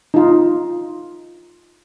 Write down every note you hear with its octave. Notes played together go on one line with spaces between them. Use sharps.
D#4 F4